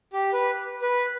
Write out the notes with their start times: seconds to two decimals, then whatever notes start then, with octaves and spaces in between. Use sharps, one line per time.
0.13 G4
0.33 B4
0.82 B4